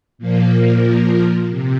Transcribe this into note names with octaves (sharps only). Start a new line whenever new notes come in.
A#2 F3 A#3
C3